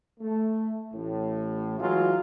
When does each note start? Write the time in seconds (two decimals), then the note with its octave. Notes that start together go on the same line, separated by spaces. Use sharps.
0.20 A3
0.93 A1 A2
1.78 E3 F#3 G#3 F4